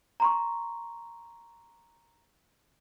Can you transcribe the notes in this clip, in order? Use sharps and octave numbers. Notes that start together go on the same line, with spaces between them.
A#5 C6 C#6